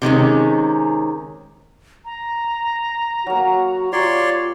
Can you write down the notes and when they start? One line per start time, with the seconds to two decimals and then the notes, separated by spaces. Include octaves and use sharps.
0.02 C3 D#3 G#3 C#4
2.05 A#5
3.27 F#3 A#3 F#4
3.93 F4 G4 C#5 D5 C6